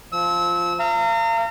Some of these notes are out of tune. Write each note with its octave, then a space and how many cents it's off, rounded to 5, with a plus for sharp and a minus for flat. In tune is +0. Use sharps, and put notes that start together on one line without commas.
F3 -5 E6 -25
F5 -35 A#5 -35